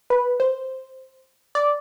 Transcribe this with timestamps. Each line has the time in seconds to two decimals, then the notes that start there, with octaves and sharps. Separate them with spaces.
0.10 B4
0.40 C5
1.55 D5